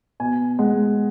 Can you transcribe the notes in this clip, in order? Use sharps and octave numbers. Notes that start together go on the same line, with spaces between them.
B2 G#5
G#3 F#5